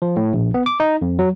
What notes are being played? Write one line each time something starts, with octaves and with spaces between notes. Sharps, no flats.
F3
A2
A#1
B3
D6
D#4
F2
F#3